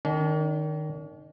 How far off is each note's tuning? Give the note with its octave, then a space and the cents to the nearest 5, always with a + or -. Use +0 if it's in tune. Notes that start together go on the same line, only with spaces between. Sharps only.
D#3 -10 C#4 +45